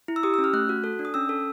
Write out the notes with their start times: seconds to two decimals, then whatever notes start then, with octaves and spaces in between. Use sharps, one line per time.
0.08 E4
0.16 E6
0.23 G4 D#6
0.34 E6
0.38 C#4
0.44 F6
0.53 A3 F#6
0.69 F#4
0.84 A4
0.99 D4
1.05 D#6
1.14 C#4 E6
1.29 A4